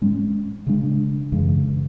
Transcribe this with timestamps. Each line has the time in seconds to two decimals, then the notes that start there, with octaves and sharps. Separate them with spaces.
0.01 G#2 G#3 C#4
0.66 C#3 G#3 D4
1.32 F#2 C#3 E3 G#3